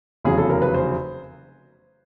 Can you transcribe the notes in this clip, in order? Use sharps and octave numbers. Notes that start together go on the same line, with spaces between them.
F1 E2 C#3 F#3 G#4
A4
A#4
B4
C5